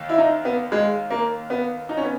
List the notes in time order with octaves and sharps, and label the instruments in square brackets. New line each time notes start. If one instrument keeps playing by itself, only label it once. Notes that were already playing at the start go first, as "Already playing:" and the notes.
Already playing: [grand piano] D#2 D#3 A#3
[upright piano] E4
D#4
B3
G#3
A#3
B3
D#4
C#4
B3